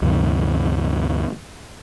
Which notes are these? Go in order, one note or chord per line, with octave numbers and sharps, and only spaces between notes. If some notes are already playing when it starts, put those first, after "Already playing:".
D2 G2 C3 E3